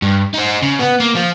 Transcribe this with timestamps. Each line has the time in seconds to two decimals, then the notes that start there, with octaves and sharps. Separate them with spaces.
0.02 G2
0.34 D#4 C5
0.62 C#3
0.79 B3
1.00 A#3
1.15 F3 F4